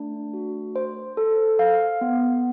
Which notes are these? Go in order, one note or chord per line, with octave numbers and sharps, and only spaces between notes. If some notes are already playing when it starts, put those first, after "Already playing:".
Already playing: A3 D4
F#4
C5
A4
F5
B3